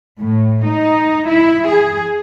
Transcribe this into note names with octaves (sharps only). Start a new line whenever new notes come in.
A2
D#4
E4
G#4